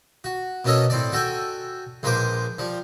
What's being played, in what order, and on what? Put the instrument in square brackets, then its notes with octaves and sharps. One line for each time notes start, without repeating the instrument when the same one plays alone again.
[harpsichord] F#4
B2 A#3 C#4 A4 C#5 D#5
A2 C4 D5
F#4 A4 G5 G#5
A#1 G#3 A#3 B4 C5 D6
F3 G3